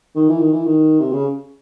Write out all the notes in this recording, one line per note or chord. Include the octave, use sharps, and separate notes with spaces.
D#3
E3
D#3
E3
D#3
C3
C#3